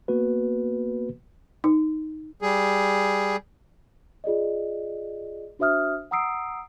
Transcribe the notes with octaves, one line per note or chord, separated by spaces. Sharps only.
A#3 B3 F#4 B4
D#4
G3 G#4
F4 G#4 D5 D#5
D4 F#4 C5 E5 D#6 F6
F#5 A#5 D#6 E6 C7 D7